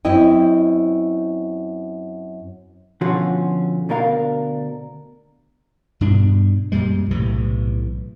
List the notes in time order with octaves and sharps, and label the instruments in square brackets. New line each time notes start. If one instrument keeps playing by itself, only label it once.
[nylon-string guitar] F#2 C4 E4 D#5 G5
[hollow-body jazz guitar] B2 D3 F3 C#4 F4 F#4
D2 B2 D4 A#4 F5
[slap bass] G2 B2 D4
F#2 A#2 G3 G#3
B1 A2 C3 E3